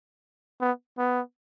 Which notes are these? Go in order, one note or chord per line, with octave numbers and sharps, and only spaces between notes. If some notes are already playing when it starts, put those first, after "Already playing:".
B3
B3